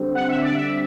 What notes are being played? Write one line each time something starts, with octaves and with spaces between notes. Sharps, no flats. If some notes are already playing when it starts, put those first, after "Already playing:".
Already playing: D3 G3 C4
F#5
E5
D5
E5